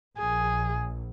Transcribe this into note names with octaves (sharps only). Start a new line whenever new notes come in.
A#1 G#4